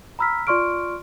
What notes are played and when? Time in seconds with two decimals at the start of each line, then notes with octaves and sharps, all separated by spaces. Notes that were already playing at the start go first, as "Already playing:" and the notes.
0.19 A#5 B5 E6 F6 B6
0.47 F4 D5 C6 C#6 F6 D7